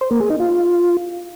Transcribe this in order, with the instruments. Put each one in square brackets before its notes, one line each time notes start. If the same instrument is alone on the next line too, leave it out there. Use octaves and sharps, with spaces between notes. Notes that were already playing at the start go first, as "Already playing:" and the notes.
[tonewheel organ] C5
A#3
G#4
D#4
F4